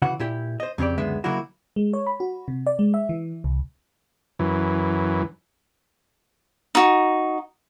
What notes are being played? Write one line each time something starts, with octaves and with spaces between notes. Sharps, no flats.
C#3 E3 F#4 F#5
A#2 E4 G4
C5 D#5
F2 C#3 C4 G4 D5
C#2 F#2 D3 G#3 B3 E5
C#3 F#3 A#3 D#4 E4 F#4
G#3
C#5
B5
F#4
C3
D5
G#3
E5
E3
C2
F#2 E3
D#4 F#4